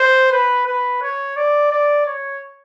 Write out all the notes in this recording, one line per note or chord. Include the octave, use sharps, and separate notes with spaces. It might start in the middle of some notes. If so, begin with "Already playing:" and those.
Already playing: C5
B4
B4
C#5
D5
D5
C#5